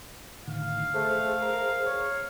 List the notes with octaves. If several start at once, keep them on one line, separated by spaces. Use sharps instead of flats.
A2 D3 D#3 F5
A3 G#4 C5
A#4
C#5